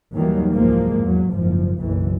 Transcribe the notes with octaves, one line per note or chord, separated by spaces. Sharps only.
D#2 D#3 E3 F#3 G3 A#3
C2 G#2 F3 G#3 A#3
E2 F#3
F#1 G#2 F3
F#1 B1 E3